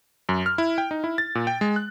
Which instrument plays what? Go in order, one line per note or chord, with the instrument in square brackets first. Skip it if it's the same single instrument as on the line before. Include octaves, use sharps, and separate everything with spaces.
[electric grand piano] F#2
F6
E4
G5
D#4
E4
A6
A#2
G5
G#3
F#6